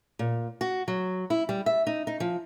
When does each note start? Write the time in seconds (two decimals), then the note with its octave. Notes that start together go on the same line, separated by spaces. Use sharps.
0.19 A#2
0.61 F#4
0.88 F#3
1.30 E4
1.49 G3
1.66 E5
1.87 D#4
2.07 D#4
2.20 F3